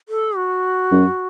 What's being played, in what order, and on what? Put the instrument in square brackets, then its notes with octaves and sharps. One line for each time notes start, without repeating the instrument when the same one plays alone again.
[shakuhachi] A4
F#4
[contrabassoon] F#2